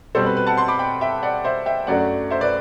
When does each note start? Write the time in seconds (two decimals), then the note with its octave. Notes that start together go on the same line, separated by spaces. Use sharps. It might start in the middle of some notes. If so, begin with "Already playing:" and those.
0.15 B2 G3 C4 A4 C5
0.26 B4
0.37 B4
0.47 F#5 A5
0.58 A5 C6
0.68 B5 D6
0.79 G5 B5
1.01 E5 G5
1.23 D5 F#5
1.44 C5 E5
1.66 E5 G5
1.87 F#2 F#3 A3 D4 D5 F#5
2.30 C5 E5
2.41 B4 D5